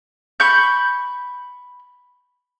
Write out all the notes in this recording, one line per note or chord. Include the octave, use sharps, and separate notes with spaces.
B5 C#6 G6